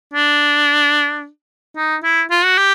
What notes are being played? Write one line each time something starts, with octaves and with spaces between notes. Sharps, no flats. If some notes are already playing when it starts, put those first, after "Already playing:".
D4
D#4
E4
F4
F#4
G4